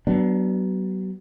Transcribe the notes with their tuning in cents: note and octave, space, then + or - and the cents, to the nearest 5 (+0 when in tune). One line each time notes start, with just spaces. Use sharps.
F#3 +35 B3 +0 D4 +0